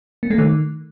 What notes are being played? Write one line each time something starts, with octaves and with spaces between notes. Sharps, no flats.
A#3
A3
D#3